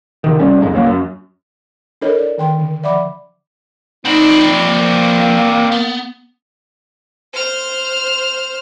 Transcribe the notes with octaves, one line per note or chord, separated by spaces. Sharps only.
C3 D#3
C3 G3 C#4
A#1 F2 G#2 G#3
C#2 F#3 A#3
F#2
D4 E4 A4 A#4 C#5 D#5
D5
D#3 G5 C6
D3
F3 D5 E5 F#5 B5 D6
F3 C4 D4 D#4 B5
A#3
B3
C5 F6